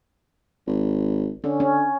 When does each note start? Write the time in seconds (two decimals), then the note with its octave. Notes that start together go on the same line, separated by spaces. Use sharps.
0.67 G#1
1.44 D3 C#4
1.60 C#4